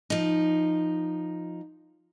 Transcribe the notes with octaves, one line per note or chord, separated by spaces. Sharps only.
F3 D#4